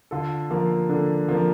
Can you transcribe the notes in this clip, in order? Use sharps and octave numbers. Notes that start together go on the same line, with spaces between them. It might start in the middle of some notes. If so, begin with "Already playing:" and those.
D3 F4 A4
F3 A#3
D3 D4
F3 A#3